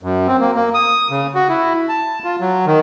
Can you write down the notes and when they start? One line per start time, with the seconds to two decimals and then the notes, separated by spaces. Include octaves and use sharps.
0.03 F#2
0.27 C4
0.40 A#3
0.55 A#3
0.74 D#6
1.11 C#3
1.35 F#4
1.49 E4
1.89 A5
2.24 F4
2.40 F#3
2.67 D#3